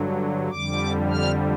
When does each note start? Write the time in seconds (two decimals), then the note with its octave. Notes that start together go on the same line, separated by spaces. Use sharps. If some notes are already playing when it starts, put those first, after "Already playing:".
Already playing: G2 D3 F#3
0.50 F2 D3 G3 D6
1.10 F6